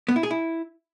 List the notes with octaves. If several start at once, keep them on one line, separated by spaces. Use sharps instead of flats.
B3
E4
G#4
E4